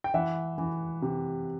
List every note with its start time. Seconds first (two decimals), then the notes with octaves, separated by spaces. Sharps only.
0.04 G5
0.14 E3 E5 F#5
0.58 E3
1.02 C3